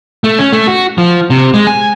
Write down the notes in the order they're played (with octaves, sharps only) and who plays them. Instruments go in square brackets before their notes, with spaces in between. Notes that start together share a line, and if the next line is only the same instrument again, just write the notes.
[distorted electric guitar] A3
C#4
A3
F#4
F3
C3
G#3
G#5